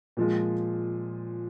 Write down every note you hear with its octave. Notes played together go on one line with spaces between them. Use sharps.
A#2 F3 G#3